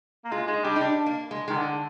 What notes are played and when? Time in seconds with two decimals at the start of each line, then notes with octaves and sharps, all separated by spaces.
0.25 A#3
0.32 G#3 F4
0.48 G#3 D#4
0.64 G3 D4
0.76 D#4
0.81 D4
1.06 A#3
1.31 G#3
1.48 D#3 G#3
1.56 D3